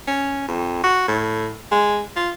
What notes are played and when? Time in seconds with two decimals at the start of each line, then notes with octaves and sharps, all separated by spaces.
0.07 C#4
0.48 F2
0.84 F#4
1.08 A2
1.71 G#3
2.16 F4